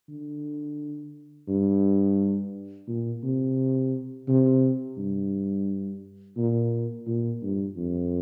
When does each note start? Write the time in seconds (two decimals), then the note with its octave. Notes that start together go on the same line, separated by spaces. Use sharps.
0.09 D3
1.48 G2
2.88 A#2
3.23 C3
4.28 C3
4.97 G2
6.37 A#2
7.07 A#2
7.42 G2
7.77 F2